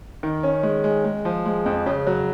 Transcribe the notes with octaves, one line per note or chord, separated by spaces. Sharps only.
D#3
C#4
G#3
G#3
G#3
F3
G#3
F2
C#3
F#3